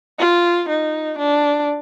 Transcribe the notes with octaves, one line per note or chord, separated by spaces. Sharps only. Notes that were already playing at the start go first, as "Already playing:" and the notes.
F4
D#4
D4